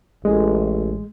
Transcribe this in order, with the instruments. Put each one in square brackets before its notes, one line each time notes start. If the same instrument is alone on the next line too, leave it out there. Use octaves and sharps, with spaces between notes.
[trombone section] A1 [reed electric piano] G#3